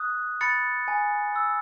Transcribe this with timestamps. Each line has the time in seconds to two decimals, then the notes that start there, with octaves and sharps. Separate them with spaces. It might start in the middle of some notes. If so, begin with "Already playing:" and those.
Already playing: D#6 F#6
0.41 B5 A6 C#7
0.88 G#5
1.36 E6